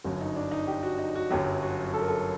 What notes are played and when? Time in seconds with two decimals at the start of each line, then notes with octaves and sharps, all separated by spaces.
0.04 G1 F#2 F#3
0.21 D#4
0.36 D4
0.51 D#4
0.67 G4
0.83 F#4
0.99 D#4
1.16 F#4
1.30 G1 F#2 F#3 G4
1.62 F#4
1.94 A4
2.01 A#4
2.08 A4